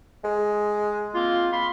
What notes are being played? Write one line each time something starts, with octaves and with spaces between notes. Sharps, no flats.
G#3
A#3 C4 F4
F5 B5 C6